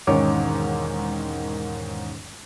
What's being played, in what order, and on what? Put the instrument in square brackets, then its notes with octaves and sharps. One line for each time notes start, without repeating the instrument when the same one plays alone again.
[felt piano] E1 G#2 D#3 C#4 C#5 D6